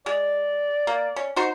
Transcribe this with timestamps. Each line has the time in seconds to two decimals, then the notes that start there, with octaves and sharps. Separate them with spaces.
0.06 G#3 D5
0.87 A#3
1.16 C#4
1.36 D#4 F#4 C5